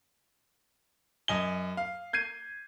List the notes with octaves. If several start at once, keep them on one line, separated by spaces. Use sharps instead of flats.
F#2 D#5 G#5 G7
F5
G6 G#6 C7 D#7